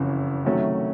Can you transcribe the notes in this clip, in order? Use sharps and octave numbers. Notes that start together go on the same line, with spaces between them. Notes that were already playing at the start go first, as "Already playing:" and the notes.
Already playing: F#1 F2 C#3 E3
C3 D#3 F#3 A3 C#4